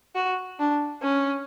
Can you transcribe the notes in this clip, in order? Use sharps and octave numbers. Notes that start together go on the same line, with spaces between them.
F#4
D4
C#4